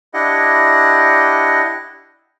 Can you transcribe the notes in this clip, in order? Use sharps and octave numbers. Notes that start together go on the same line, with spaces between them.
D4 E4 G4 D#5 F#5